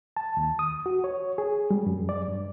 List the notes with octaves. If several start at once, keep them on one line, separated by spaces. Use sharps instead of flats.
A5
D#2
D#6
F#4
C#5
G#4
G3
F#2
D5
G2